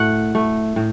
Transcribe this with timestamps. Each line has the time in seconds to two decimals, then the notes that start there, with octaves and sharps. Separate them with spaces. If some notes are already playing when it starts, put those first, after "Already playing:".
Already playing: A2 A3 F#5
0.35 A3
0.76 A2